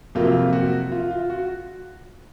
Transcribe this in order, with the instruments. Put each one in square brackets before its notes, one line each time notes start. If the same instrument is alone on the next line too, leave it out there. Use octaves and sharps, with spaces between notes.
[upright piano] F2 C3 F#3 A#3 F4
F#4
F4
F4
F#4